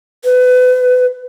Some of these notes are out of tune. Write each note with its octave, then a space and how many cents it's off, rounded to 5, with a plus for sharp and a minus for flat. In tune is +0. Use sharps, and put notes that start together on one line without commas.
B4 +25